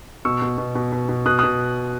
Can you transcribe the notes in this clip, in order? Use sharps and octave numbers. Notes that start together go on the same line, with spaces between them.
B2 C#6 E6
B2
B2
B2
B2
B2
B2 D#6 F#6
D#6 F#6
B2